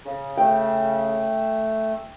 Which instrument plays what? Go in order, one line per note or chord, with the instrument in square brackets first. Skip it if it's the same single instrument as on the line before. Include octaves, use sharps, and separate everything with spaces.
[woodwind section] C#3
[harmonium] A3 [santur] G5